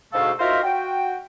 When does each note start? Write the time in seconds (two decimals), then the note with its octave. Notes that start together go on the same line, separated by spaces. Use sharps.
0.12 D2 G#2 B2 A3 A4 F5
0.39 D#4 F4 F#4 A#4 C5 E5
0.63 F#4 G5